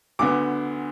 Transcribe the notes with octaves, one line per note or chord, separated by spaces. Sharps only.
D2 D3 B3 D6